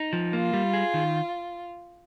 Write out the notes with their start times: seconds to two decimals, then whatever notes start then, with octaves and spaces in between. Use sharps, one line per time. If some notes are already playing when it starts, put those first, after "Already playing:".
Already playing: D#4
0.13 F3
0.33 A#3 F4
0.53 G3
0.73 G#4
0.94 D#3